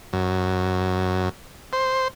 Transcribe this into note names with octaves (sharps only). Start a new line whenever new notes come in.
F#2
C5